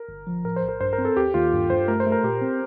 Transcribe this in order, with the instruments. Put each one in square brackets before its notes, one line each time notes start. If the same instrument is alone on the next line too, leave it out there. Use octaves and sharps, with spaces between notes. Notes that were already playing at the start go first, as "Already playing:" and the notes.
Already playing: [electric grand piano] A#4
[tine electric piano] G1
F3
[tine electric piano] A2 [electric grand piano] A#4
[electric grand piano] C5
[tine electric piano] A#1
[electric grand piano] A#4
[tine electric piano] G2 [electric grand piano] C5
[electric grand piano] A#4
[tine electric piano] C4
[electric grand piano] A4
[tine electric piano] D#2 [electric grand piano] G4
[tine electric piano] D#2 [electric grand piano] F4
[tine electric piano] G2
[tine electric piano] G2 [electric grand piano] C5
[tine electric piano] A3 [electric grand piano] A#4
[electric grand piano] C5
[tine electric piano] A3
[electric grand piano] A#4
[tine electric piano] A#2 [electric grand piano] G4
[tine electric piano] C4